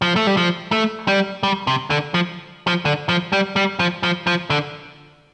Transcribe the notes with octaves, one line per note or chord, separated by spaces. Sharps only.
F3
A3
G3
F3
A3
G3
G3
C3
D3
F3
F3
D3
F3
G3
G3
F3
F3
F3
D3